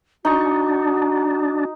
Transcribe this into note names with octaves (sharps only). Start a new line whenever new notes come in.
D4 D#4 F#4 C#6